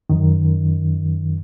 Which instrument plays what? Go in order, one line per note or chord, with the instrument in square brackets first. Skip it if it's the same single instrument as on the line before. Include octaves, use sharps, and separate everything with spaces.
[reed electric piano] F#2 D#3